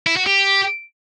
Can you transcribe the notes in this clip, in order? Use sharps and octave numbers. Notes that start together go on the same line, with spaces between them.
E4
F#4
G4